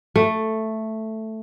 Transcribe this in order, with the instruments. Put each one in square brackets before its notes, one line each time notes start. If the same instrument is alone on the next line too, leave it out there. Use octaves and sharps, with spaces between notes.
[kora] A3